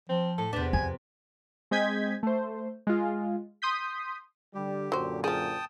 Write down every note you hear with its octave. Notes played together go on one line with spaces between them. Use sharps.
F3 C4
A2 A4
E2 C3 B3 D4
F2 G#5
G#3 C4 D#5 G6 G#6 B6
A3 C5
G#3 F4
C6 D#6 G6 B6
D3 G3 G4
F#2 A#2 D3 F#3 C5
F3 G#4 G5 A5 D#6